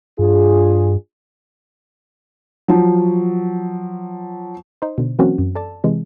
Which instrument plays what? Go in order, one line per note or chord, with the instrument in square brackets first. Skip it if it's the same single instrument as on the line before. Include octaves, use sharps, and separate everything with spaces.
[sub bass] G2 [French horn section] D4 F4 G#4
[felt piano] F3 F#3
[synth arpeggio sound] D#4 C5
B2 D3
E3 F#3 A#3 C4 C#4 F#4
F#2
A4 D5 A5
C3 E3 G#3